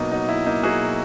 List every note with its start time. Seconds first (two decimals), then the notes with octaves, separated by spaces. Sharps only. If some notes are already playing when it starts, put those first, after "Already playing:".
Already playing: B2 F#3 A#3 D#4
0.11 F#3 D#4
0.28 B2 E4
0.46 A#3 D#4
0.63 F#3 F#4 G#4
0.81 B2